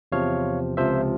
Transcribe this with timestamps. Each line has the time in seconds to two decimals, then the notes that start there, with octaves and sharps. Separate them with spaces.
0.12 E2 C3 F3 C#5 F5
0.77 C#2 C3 F3 C5 E5